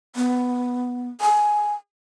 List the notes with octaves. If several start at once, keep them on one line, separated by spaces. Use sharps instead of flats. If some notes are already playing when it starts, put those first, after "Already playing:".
B3
G#5